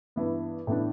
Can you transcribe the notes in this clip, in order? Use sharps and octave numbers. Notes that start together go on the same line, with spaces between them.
G2 E3 B3
A2 E3 B3 D4